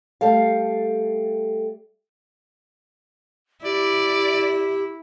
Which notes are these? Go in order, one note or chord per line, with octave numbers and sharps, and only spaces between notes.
G3 A3 A4 F5
E4 G4 D5